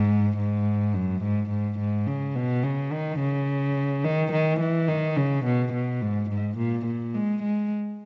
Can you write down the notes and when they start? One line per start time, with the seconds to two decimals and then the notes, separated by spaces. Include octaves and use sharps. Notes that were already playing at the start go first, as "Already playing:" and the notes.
Already playing: G#2
0.37 G#2
0.94 F#2
1.22 G#2
1.50 G#2
1.79 G#2
2.07 C#3
2.35 B2
2.63 C#3
2.92 D#3
3.19 C#3
4.04 D#3
4.32 D#3
4.60 E3
4.88 D#3
5.17 C#3
5.45 B2
5.73 B2
6.01 G#2
6.30 G#2
6.58 A#2
6.86 A#2
7.14 G#3
7.43 G#3